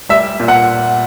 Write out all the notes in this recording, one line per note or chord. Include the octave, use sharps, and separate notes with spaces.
G3 E5
A#2
F#5